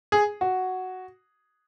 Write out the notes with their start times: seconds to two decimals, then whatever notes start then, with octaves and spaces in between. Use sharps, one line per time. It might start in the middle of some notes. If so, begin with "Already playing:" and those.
0.12 G#4
0.41 F#4